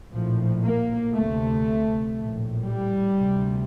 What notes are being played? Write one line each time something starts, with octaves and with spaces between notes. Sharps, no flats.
A#1 A2 F3
A#3
D2 C3 A3
A#1 A2
G3
D2 C3